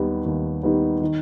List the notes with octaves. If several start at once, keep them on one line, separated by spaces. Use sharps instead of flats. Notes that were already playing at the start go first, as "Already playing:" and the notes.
Already playing: D#2 D#3 G3 B3
D#2
D#3 G3 B3
D#3